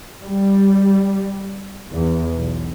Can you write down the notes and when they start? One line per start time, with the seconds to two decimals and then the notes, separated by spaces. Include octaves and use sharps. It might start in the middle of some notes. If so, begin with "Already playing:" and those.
0.23 G3
1.92 E2
2.38 B1